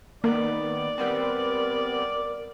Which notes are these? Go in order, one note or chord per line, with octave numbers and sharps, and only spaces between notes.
D#3 A#3 B3 D5
G3 B3 C4 A#4